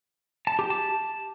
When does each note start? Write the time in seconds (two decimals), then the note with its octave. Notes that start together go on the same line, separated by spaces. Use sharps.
0.47 A5
0.59 G4
0.70 A5